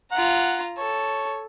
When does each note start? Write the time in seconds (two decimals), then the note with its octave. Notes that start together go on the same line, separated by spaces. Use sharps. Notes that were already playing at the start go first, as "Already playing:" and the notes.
0.12 F4 F#5 A#5
0.78 A4 C#5